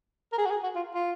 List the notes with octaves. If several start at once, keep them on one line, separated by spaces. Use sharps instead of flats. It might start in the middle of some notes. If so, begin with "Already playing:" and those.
A#4
G#4
F#4
G#4
F#4
F4
F4